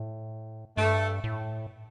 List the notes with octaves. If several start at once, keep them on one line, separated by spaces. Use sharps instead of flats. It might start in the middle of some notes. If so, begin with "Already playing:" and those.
Already playing: A2
G2 A3
A2